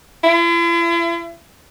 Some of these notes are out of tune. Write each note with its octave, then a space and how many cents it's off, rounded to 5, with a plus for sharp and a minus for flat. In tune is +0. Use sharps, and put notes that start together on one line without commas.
E4 +45